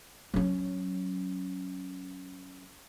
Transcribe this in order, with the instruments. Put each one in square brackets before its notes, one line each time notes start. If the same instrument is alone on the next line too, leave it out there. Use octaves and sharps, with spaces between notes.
[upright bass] F#3 C#4